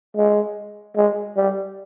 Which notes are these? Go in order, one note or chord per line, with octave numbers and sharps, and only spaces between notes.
G#3
G#3
G3